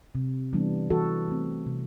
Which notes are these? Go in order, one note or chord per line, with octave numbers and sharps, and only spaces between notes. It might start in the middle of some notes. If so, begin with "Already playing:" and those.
C3
E3 G3 B3 D4
E3 F#4 A4
A3 C4
C3